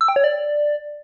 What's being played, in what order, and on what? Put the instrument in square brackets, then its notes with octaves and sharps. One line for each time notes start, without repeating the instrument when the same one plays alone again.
[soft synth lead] E6
G5
C#5
D5